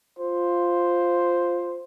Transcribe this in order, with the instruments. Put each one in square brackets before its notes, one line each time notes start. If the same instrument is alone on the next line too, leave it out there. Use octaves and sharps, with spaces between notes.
[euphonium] F4 [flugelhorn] C5